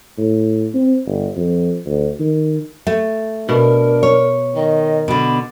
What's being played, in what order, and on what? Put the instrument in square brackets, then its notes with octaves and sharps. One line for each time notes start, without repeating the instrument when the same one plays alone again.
[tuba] A2
C4
G1
F2
D2
D#3
[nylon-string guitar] A3
[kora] B2 [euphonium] D4 [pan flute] A#4
[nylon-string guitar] C#5
[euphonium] D#3 [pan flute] D#5
[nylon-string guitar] B2 D3 [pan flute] B5